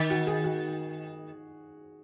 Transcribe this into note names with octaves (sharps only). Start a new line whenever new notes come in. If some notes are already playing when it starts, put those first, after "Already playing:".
Already playing: D#3
F#4
G#4
F#4